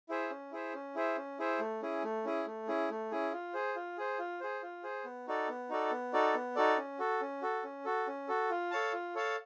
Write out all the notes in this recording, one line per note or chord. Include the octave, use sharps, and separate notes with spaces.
E4 G#4 C5 E5
C#4
E4 G#4 C5 E5
C#4
E4 G#4 C5 E5
C#4
E4 G#4 C5 E5
A3
C#4 E4 G#4
A3
C#4 E4 G#4
A3
C#4 E4 G#4
A3
C#4 E4 G#4
F4
G#4 C5
F4
G#4 C5
F4
G#4 C5
F4
G#4 C5
B3
D#4 F#4 A4 D5
B3
D#4 F#4 A4 D5
B3
D#4 F#4 A4 D5
B3
D#4 F#4 A4 D5
C#4
F#4 A4
C#4
F#4 A4
C#4
F#4 A4
C#4
F#4 A4
F4
A4 C#5 F5 A5
F4
A4 C#5 F5 A5